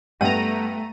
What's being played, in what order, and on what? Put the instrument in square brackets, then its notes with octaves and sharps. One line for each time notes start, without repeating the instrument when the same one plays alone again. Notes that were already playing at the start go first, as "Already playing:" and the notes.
[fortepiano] G2 [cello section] A3 [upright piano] B3 G4 F#5 [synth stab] A#5 D#7